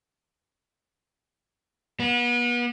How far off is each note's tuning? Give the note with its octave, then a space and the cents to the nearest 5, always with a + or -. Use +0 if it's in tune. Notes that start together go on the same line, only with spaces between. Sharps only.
B3 -35